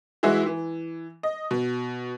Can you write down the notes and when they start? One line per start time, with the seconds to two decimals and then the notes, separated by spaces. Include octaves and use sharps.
0.23 E3 G#3 E4 F#4
0.46 E3
1.23 D#5
1.51 B2